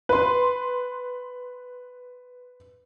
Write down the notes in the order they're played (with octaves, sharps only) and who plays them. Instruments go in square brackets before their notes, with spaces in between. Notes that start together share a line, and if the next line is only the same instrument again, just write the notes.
[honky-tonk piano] B4 C6